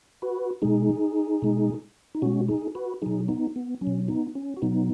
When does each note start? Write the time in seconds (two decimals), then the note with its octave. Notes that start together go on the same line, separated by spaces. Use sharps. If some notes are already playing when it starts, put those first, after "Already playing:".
0.22 F#4 B4
0.62 B2 G#3 D#4 G#4
1.42 B2 G#3
2.15 D#4
2.22 B2 G#3 C#4 F#4
2.48 D#4 G#4
2.75 F#4 B4
3.02 B2 F#3 D#4 G#4
3.28 B3 D#4
3.56 B3
3.81 F#3 C#4
3.87 B2
4.08 B3 D#4
4.35 C#4
4.57 F#4
4.62 B2 F#3 B3 D#4